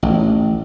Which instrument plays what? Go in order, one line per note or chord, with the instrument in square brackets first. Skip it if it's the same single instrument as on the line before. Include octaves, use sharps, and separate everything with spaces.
[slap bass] A1